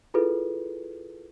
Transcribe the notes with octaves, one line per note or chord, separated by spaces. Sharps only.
E4 F4 G#4 A4 B4